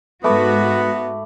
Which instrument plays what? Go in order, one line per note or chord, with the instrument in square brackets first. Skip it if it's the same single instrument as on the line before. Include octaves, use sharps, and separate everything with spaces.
[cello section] G#2 F#4 [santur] A3 B5 D6 [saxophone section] B3